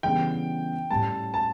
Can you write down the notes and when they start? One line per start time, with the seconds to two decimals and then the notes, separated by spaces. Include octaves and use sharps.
0.03 C#3 E3 G3 B3 D4 G5
0.90 A2 G3 C#4 A5
1.34 A5